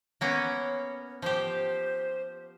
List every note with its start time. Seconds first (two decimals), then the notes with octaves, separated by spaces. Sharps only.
0.21 A#3 B3 C#4 C#5
1.22 F3 G4 C5